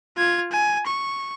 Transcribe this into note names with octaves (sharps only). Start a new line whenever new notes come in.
F4 G#6
G#5
C#6